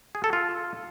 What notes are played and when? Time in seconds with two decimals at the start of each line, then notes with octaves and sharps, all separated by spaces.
0.15 G#4
0.24 A4
0.33 F4